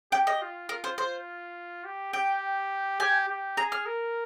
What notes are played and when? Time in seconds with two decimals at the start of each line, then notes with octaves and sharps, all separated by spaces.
0.12 G4 G5
0.27 D#5
0.42 F4
0.69 F4 A#4
0.84 C5
0.98 F4 C5
1.85 G4
2.13 G4 G5
3.00 G4 G#5
3.29 G4
3.57 G#4 A#5
3.72 F6
3.86 A#4